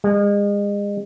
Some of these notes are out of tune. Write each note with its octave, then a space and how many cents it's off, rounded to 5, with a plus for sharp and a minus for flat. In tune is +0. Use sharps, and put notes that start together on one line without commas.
G#3 -35